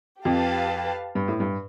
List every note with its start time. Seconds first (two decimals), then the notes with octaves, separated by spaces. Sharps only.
0.25 F2 G4 B4 F5 A5
1.15 G2
1.28 A2
1.40 G2